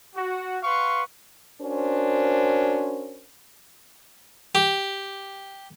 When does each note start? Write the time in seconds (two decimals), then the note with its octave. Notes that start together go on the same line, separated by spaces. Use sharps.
0.14 F#4
0.63 B4 F5 F#5 C6 C#6
1.61 C#4 D4 F#4 A#4 C5
4.55 G4